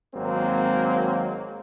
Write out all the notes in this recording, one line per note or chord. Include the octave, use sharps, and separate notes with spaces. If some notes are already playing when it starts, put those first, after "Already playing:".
G#1 F#3 G#3 A#3 C4